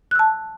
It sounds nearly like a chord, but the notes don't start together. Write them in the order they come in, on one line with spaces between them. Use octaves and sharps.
F#6 E6 A5